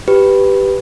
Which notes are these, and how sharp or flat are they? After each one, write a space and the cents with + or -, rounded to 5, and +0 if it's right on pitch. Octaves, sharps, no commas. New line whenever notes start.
G4 +0 B4 +0